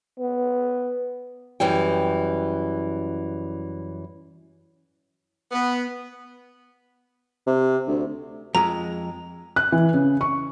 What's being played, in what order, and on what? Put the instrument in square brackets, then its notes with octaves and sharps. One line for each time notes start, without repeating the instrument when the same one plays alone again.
[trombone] B3
[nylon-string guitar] F#2 E3 G3 G5
[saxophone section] B3
[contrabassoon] C3
D2
[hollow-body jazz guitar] F2 G#3 [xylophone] A#5
[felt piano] F#6
E3
C#3
C#6